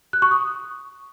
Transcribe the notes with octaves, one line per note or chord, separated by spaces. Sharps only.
F#6
C#6
D#6